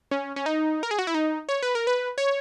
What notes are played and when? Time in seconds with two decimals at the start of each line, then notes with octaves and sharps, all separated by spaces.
0.11 C#4
0.36 C#4
0.46 D#4
0.83 A#4
0.91 G#4
0.99 F#4
1.07 E4
1.14 D#4
1.49 C#5
1.63 B4
1.75 A#4
1.87 B4
2.18 C#5